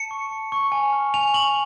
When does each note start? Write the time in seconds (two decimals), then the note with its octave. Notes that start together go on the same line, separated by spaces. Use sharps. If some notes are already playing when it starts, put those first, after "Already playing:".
Already playing: A5 C#7
0.11 C#6
0.31 A5
0.52 C#6
0.72 G#5
0.93 F6
1.14 G#5 F7
1.34 C#6 F#7